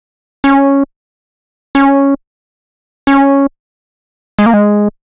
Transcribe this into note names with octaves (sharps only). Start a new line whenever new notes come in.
C#4
C#4
C#4
G#3
A#3
G#3